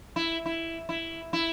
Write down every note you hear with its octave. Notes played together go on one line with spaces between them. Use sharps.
E4
E4
E4
E4